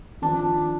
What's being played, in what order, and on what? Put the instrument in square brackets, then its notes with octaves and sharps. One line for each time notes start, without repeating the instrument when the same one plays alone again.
[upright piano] D#3 F3 [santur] D4